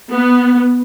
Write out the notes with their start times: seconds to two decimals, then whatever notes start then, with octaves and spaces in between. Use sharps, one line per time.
0.12 B3